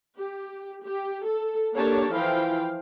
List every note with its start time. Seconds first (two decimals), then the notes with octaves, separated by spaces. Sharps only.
0.18 G4
0.84 G4
1.26 A4
1.76 A#3 D4 G4 A4 C#5 A5
2.13 E3 F3 E4 F5 G5